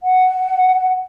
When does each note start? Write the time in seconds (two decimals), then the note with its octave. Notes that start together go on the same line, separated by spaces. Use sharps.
0.03 F#5